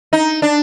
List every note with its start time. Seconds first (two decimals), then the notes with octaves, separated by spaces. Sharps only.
0.13 D#4
0.42 D4